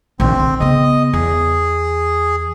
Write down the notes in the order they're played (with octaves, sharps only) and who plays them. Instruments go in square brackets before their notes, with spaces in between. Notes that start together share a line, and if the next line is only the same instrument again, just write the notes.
[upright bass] A#1 D#3 [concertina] C4
[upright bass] D3
[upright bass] C#3 B3 [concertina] D#5
[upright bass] E2 [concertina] G#4